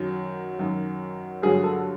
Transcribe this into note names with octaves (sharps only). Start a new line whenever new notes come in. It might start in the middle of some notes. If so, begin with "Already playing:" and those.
Already playing: F#2 D#3 F#3
F#2 D#3 F#3
G2 D3 F#3 G#4
A4